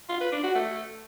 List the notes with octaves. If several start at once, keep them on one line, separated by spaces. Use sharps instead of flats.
F4
B4
D4
F#4
A3